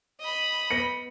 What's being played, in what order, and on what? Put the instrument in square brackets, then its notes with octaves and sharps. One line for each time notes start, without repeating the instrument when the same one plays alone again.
[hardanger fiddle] D#5 B5
[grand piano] B3 A#6 C#7